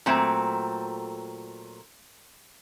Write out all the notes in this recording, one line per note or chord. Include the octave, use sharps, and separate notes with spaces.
A#2 F#3 A3 C4